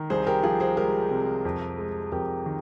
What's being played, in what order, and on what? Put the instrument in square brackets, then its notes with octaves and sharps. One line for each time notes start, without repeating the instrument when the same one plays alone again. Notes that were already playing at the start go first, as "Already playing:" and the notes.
Already playing: [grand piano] D#3
[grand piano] C2 [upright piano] G#4 C5
[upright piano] G4 A#4
[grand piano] F3 [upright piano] F4 G#4
[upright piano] G#4 C5
[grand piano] G#3 [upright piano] G4 A#4
[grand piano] C3
F2
G#3
[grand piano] F2 [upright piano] G4 A#4
[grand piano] D#3